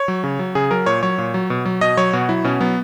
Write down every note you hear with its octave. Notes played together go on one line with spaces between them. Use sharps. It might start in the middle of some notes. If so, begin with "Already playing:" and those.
Already playing: C#5
F#3
C#3
F#3
C#3 G#4
F#3 A#4
A#2 C#5
F#3 C#5
A#2
F#3
B2
F#3
B2 D#5
F#3 C#5
B2 F#4
F#3 E4
B2 C#4
F#3 B3